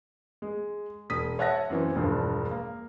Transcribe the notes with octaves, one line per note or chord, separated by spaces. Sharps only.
G#3
E1 D#6 B6
C#5 E5 F#5 A5 F#6 A#6
F#2 E3 C4
E1 G2 F3 D4
A#3